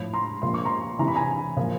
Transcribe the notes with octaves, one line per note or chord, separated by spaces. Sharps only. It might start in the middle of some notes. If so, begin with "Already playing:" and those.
Already playing: A2 F3 B5
A#5 C6
A#2 F3 C6
C#6
A#5 C6
C3 E3 A#5
B5
G#5 A#5
A#2 F3